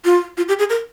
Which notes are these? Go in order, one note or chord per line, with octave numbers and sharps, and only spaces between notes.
F4
F4
G4
G#4
A#4